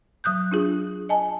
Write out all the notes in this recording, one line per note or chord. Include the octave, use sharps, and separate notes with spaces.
F#3 D#6 F#6 G6
D4 F4 G#4
D#5 G#5 A5